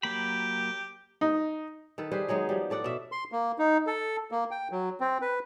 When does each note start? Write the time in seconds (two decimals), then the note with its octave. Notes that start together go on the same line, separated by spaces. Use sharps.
0.03 F#3 A#3 G4 B5
1.21 D#4
1.98 D#3 A4 B4
2.12 G3 G#4 B4 C5
2.28 F#3 G#3 B3 D#4
2.49 F3 G3
2.70 A2 A4 D5 F#5
2.84 B2 E5
3.12 C6
3.32 A#3
3.59 D#4
3.87 A4
4.31 A#3
4.51 G5
4.71 F#3
5.00 C4
5.21 B4